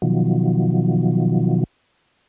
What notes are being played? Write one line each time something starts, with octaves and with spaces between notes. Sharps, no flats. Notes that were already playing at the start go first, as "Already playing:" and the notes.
B2 D#3 F3 F#3